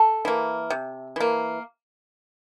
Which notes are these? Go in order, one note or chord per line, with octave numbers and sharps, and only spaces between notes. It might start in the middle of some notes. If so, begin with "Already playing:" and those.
Already playing: A4
E3 A#3
C3
E3 A#3